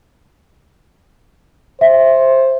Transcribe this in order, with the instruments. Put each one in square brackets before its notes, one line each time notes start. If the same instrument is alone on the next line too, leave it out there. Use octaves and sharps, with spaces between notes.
[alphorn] C5 [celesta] E5